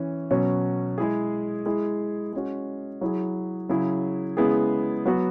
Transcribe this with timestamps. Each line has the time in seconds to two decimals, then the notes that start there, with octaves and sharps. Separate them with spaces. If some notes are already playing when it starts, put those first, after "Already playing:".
Already playing: E3 C#4
0.31 B2 F#3 C#4
0.98 G#3 E4 G#4
1.66 G#3 E4 G#4
2.33 G#3 C#4 F#4
3.01 F#3 E4 G#4
3.70 C#3 F#3 E4 G#4
4.37 C#3 G#3 B3 E4 G#4
5.06 F#3 B3 F#4